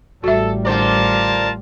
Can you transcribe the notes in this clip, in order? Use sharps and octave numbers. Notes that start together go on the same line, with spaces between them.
A1 G3 F#4 A4 E5
D3 F4 A#4 C5 D5 A5